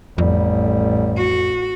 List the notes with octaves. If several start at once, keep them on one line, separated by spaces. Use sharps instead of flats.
A1 F2 G3
F#4